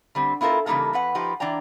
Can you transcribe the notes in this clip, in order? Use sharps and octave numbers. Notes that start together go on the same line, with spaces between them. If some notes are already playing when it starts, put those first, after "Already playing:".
D3 G3 C4
B3 E4 F4 A4 A#4
C#3 E3 G3 A#3 D#4 A4
F2 B4 F#5
F3 D#4 G4 B4
E3 D4 D5 G5 A#5